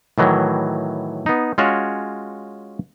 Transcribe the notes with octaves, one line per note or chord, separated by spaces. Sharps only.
A2 D#3 E3 F#3
B3 D#4
G#3 C#4 F4 F#4 C#5